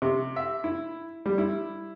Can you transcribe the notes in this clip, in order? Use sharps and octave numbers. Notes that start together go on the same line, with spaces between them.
C3
E5
E4
G3
E4